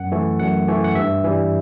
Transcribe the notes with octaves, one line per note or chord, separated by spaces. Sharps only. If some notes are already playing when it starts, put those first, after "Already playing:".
Already playing: F#2 F#5
E3 A3
F#2 F#5
E3 A3
F#5
G2 E5
E3 G3